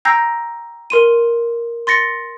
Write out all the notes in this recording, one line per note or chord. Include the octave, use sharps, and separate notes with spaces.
G5 A#5 E6 G6 A#6 C7
A#4 C6 D#7
C6 A6 A#6 C#7